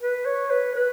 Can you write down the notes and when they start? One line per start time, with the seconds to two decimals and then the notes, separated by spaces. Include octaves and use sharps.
0.01 B4
0.26 C#5
0.51 B4
0.75 B4